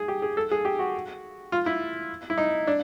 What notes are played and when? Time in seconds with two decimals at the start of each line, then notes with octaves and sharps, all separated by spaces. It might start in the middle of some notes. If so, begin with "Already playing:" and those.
Already playing: G#4
0.08 G4
0.22 G#4
0.37 A4
0.51 G#4
0.65 G4
0.79 F#4
1.52 F4
1.66 E4
2.30 E4
2.38 D#4
2.67 D4